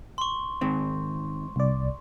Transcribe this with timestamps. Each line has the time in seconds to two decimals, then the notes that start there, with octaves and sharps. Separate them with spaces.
0.18 C6 C#6
0.61 G#2 D#3 C4
1.56 C2 D5